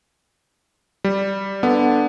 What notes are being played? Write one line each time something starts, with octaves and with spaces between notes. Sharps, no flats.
G3
D3 B3